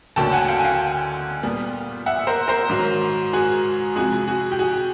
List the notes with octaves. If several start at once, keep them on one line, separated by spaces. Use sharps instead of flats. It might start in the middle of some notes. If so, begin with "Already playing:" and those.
D2 D3 F#3 A#3 G5 A5
F#5 G#5
F5 G5
G#5
F5 G5
A#2 G3 B3
E5 F#5
A#4 C5
A#4 C5
G#2 D#3 F#3
F#4 G#4
F2 C3 F3 G#3 F#4 G#4
F#4 G#4
G4
F#4 G#4